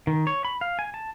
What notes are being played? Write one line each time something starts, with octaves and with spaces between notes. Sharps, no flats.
D#3
C#5
B5
F5
G#5
A5